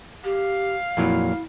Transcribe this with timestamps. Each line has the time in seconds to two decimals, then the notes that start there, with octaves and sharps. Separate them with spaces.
0.24 G4 F5
0.97 F2 A#2 F#3 E4